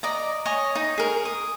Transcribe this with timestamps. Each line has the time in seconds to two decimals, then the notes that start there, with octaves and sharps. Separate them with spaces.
0.03 D5 D#5 A#5
0.45 C#5 D#5 G#5
0.75 D#4
0.98 G#4 A#4
1.25 D#6